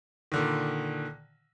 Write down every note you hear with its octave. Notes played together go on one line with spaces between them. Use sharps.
A#2 D3 D#3